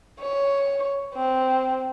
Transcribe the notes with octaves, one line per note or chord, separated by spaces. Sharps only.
C#5
C4